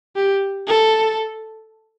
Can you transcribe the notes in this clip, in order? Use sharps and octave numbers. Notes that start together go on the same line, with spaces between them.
G4
A4